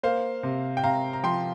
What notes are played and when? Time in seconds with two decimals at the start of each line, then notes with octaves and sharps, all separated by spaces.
0.03 A#3 C5 F5
0.43 C3
0.77 G5
0.83 C3 F5 A#5
1.13 A#5
1.23 F3 G5 C6